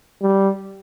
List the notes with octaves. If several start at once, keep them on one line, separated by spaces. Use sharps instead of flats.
G3